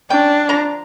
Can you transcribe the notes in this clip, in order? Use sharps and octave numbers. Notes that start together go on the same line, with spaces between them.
C#4 D4 G5
D3 F3 A#5